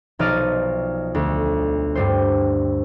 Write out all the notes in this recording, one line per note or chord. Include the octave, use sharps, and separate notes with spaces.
B1 F3 D#4 D5 F6 D#7
D2
G2 G3 C5